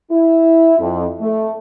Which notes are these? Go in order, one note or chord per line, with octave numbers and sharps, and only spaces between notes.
E4
F2
A3